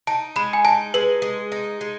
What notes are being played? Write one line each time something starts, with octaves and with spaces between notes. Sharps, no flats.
D#4 A5
G#3 B5
G#5
D#4 A5
G#3 B4
G#3
D#4
G#3